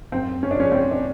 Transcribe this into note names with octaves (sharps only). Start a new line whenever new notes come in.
F#2 C4
C#4
D4
C#3 F3 C#4
C4
D4